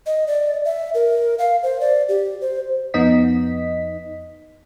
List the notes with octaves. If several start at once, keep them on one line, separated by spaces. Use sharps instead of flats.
D#5
D5
E5
A#4
F5
C5
D5
G4
C5
F2 B3 D#4 D#5 B6